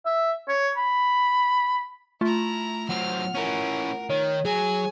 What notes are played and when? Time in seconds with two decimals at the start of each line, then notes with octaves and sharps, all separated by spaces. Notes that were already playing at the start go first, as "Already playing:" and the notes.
0.05 E5
0.48 C#5
0.77 B5
2.21 A3 E4 F4 A#5
2.89 F#3 C4 F#5 F6
3.35 E3 C#4 A#4
4.10 D#3 C#5
4.45 F#3 G#4 G#5